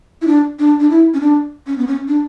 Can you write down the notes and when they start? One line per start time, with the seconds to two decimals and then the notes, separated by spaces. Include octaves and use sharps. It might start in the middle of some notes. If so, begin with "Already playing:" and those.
0.22 E4
0.27 D4
0.59 D4
0.80 D4
0.90 E4
1.14 C#4
1.21 D4
1.67 C#4
1.78 B3
1.87 C#4
2.08 D4